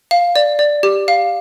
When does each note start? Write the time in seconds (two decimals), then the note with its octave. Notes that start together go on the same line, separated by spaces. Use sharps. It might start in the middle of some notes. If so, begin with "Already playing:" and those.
0.11 F5
0.36 D5
0.59 D5
0.83 G4
1.08 F5